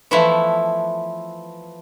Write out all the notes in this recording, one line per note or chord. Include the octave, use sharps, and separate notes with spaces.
E3 F3 A3 B3 E4